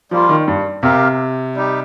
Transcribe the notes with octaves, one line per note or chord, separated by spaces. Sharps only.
F3 G3 A#3 F4
D#3
G2
C3 C4 G4 A#4 F5
G3 D#4 G4